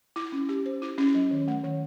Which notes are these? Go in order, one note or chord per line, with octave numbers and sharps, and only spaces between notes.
E4
C#4
G4
C5
E4
C#4
F#3
D#3
A3
D#3